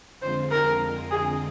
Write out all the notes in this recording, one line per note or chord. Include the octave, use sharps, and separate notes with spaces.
F2 D3 G#3 C4 F4 C5
A#4
G#4